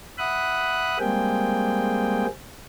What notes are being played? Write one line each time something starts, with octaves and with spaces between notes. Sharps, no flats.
E5 F#5 B5 D#6 F#6
G3 G#3 A#3 C4 G#4 G5